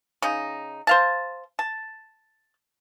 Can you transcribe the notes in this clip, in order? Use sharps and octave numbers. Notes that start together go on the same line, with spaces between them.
C#3 D#4
C5 F5 A5
A5